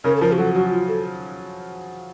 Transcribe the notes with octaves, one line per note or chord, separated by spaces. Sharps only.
C#3 C#4 A#4
A4
F3 A#4
F#4
F#3 A4
F#3 F#4
F4
A4